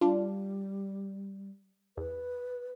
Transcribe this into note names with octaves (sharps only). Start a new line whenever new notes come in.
G3 D4 F4
E2 B4